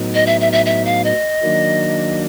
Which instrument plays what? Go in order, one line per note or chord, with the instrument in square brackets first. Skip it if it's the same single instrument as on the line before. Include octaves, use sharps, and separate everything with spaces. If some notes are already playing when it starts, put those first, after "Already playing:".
Already playing: [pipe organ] A2 F#3 B3 D#4
[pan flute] D#5
E5
E5
E5
E5
F5
D#5
[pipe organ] D#3 F#3 A#3 D4